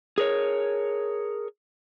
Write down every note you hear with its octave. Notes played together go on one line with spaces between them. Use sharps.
G#4 A#4 C#5